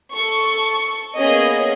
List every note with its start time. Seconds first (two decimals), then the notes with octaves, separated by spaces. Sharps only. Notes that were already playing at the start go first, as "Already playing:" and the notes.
0.13 A4 C#6
1.18 A#3 B3 C#4 G#4 D#5